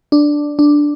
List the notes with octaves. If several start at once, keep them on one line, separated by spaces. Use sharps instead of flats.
D4
D4